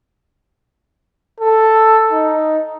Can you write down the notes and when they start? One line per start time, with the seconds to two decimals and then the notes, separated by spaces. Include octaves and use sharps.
1.40 A4
2.12 D#4